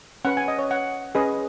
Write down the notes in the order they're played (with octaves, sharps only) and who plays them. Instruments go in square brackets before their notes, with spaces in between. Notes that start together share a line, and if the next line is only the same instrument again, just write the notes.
[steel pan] C#4 B4 F#5
G#5
D#5
C#5
F#5
C#4 G#4 B4 D#5